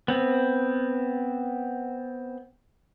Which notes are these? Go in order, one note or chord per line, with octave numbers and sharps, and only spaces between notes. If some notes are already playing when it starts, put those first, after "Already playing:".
B3 C4